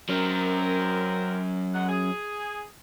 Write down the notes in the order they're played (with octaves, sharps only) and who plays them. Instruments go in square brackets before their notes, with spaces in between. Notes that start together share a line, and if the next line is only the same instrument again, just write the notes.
[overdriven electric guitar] F#3 C#4 [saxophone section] C4 A#4
[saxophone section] F#2 G#3 F#5
G#4